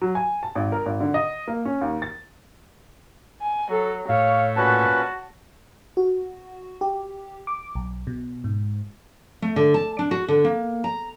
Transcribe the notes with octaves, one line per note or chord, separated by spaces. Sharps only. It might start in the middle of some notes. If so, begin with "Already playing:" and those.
F#3
G#5
A5
G#1
A#4
G#1
D3
D#5
A#3
C#4
D#2
A6
G#5
F#3 A4
A2 C#5 F5
A#2 C#4 F#4 B4 A5
F#4
G4
D6
B1
B2
G#2
A3
D3
A5
D4
F#4
D3
A#3
A#5